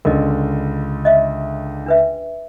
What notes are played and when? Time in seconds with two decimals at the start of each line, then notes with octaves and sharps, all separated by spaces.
0.05 C#2 D3 A#4 D#5
1.05 D#5 E5
1.86 D4 B4 E5